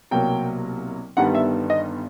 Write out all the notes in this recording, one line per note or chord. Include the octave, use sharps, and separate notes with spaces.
C2 B2 F#3 A#3 G5
G1 G2 D#3 G3 B3 F#5
E5
D#5